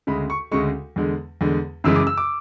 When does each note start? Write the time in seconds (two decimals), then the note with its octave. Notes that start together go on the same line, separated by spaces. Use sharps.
0.07 D2 C#3 G#3 B5
0.30 C#6
0.52 D2 C#3 G#3 C#6
0.96 E2 D3 G#3
1.41 E2 D3 G#3
1.84 F#2 C#3 E3 G#3 E6
1.96 D6
2.07 E6
2.17 D6